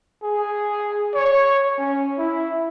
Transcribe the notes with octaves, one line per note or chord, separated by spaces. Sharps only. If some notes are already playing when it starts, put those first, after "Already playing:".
G#4
C#5
C#4
E4